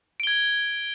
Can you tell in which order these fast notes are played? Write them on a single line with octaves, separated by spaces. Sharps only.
D7 G7 G#6